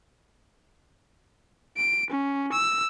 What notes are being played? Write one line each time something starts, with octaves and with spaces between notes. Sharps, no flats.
D7
C#4
E6